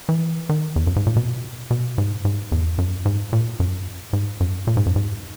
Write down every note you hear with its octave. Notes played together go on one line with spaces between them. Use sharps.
E3
D#3
E2
F#2
G#2
A#2
B2
B2
G#2
G#2
E2
F#2
G#2
A#2
F#2
G#2
F#2
A#2
G#2
F#2
G#2